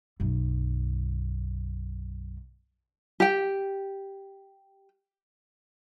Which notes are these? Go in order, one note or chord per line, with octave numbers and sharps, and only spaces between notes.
B1 F#2
G4 G5